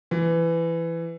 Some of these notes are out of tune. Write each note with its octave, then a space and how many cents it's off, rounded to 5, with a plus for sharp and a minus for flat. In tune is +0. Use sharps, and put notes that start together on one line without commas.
E3 +15